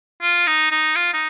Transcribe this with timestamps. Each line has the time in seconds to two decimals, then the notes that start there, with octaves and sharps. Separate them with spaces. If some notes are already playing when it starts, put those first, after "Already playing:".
0.22 F4
0.47 D#4
0.71 D#4
0.96 F4
1.14 D#4